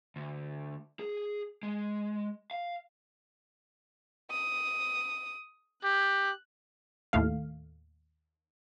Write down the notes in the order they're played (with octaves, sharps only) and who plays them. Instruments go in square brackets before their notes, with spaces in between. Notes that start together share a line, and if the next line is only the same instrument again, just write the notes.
[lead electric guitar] D2
G#4
G#3
F5
[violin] D#6
[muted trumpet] G4 [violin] F#6
[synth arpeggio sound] D#2 A2 A3 F5